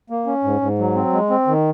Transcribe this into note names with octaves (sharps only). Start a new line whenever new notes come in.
A#3
C#4
G#2
G#2
F#3
C4
G#3
C4
D#3